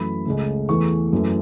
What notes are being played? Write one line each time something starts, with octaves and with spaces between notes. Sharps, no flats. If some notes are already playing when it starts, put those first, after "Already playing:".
Already playing: F#2 E3 A3 B5
C#2 C#3 A3
E2 E3 A3 C#6
F#2 E3 A3